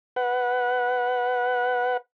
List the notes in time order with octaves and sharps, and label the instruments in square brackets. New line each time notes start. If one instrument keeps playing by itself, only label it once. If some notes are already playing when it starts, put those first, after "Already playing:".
[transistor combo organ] B4 F#5